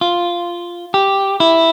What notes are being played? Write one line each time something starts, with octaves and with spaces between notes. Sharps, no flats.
F4
G4
E4